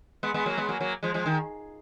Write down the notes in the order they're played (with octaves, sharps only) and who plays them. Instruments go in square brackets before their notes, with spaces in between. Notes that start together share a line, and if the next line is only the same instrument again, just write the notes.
[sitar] G#3 B3
G#3 B3
F#3 A#3
G#3 B3
F#3 A#3
F#3 A#3
F3 G#3
F3 G#3
D#3